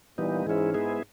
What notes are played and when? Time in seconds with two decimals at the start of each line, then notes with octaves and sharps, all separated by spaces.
0.18 A#2 E3 G3 B3 D#4
0.46 G#2 E3 G#3 C#4 E4
0.74 G#3 B3 E4 G#4